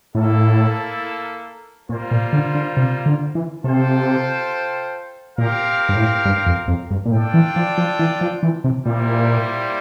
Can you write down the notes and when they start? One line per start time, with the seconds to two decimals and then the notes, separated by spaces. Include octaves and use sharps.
0.15 A2 A#3 E4 A4
1.89 A#2 G3 A#3 F4 C5
2.11 A#2
2.33 D3
2.55 D3
2.77 C3
3.06 D3
3.35 E3
3.64 C3 F4 A4 C5 G5
5.38 A#2 C4 G4 A#4 F5
5.89 G2
5.96 A2
6.25 G2
6.46 F2
6.68 F2
6.91 G2
7.06 A#2
7.12 A2 D4 F4 A4 D5 G5
7.34 E3
7.56 F3
7.78 F3
7.99 E3
8.21 F3
8.43 E3
8.64 C3
8.86 A#2 G3 A#3 E4 G4 C5